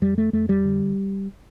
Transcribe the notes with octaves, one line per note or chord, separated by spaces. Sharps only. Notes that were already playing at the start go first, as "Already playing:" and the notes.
F2 G3
A3
F2 A3
G3
D3